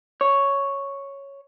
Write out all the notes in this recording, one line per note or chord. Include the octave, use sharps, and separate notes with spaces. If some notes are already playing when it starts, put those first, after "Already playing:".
C#5